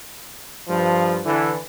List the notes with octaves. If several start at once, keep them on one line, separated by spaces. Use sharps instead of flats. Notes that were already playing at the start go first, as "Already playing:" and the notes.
G2 F3
D3 E3